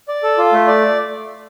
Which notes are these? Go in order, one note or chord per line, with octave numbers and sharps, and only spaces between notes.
D5
A4
F4
A3
D5